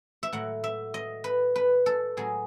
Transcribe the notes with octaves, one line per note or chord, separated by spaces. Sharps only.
E5
A2 F#3 F#5
E5
D#5
B4
B4
A4
A2 F#3 G#4